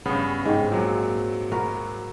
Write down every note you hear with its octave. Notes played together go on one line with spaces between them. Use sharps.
G2 C#3 B3
G#2 C4
A#2 F#3
F#4 A#4 B4